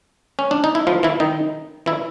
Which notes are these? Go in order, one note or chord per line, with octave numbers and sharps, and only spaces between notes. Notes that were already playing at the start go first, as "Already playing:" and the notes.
C#4
D4
D#4
E4
F3 F4
E3 E4
D#3 D#4
E3 E4